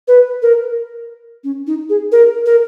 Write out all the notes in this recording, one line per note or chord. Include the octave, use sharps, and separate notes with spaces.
B4
A#4
C#4
D#4
G#4
A#4
A#4